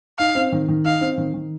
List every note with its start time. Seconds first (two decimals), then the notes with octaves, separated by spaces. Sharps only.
0.19 D#4 F5
0.35 C4
0.52 D#3
0.68 D#3
0.85 D#4 F5
1.01 C4
1.18 D#3
1.34 D#3